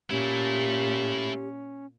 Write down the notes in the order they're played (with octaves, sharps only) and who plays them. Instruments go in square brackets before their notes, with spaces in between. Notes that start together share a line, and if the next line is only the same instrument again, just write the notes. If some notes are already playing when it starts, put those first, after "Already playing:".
[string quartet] A#2 [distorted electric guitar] A3 E4 [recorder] C#4 [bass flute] G4